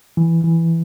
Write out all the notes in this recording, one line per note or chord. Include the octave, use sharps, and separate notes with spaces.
E3
E3